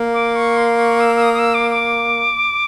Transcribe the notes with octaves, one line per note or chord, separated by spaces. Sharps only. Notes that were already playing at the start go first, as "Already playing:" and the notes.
Already playing: A#3
D6
C#6
C6
C#6
E6
E6
D#6
D#6
E6
D6
D6